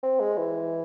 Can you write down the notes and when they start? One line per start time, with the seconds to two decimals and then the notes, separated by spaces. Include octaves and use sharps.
0.03 C4
0.20 G#3
0.37 E3